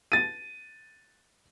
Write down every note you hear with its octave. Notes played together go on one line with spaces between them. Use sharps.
A6 D#7